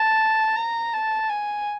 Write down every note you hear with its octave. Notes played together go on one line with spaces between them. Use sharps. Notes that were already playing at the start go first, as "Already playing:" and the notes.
Already playing: A5
A#5
A5
G#5